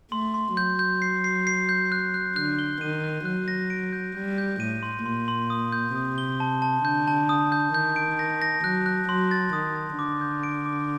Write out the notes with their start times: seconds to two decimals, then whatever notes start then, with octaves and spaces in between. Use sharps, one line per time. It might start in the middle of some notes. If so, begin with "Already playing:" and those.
0.12 A3 C6
0.34 C6
0.56 F#3 G6
0.79 G6
1.02 C7
1.24 C7
1.47 C7
1.69 G6
1.92 F#6
2.14 F#6
2.36 D3 F#6
2.59 G7
2.81 D#3 D#7
3.04 F#6
3.25 F#3 F#6
3.48 A#6
3.70 D7
3.93 G6
4.15 G3 G6
4.38 G6
4.60 A2 D#7
4.83 C6
5.05 A#2 C6
5.28 C6
5.50 D#6
5.72 G6
5.95 C3 D#6
6.18 G7
6.40 A5
6.62 A5
6.85 D3 G6
7.08 A5
7.29 D#6
7.52 G6
7.74 D#3 G6
7.96 D7
8.19 A#6
8.42 A#6
8.64 F#3 F#6
8.86 F#6
9.09 F#3 C6
9.31 A6
9.53 D#3 D#6
9.75 A6
9.98 D3 D6
10.21 G6
10.43 D7
10.66 D6